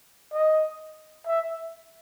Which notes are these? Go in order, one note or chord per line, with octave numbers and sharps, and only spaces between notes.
D#5
E5